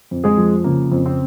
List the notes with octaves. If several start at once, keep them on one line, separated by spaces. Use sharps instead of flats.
F2
G#3 G#4
F3
C#3 A#3 A#4
F2
C4 C5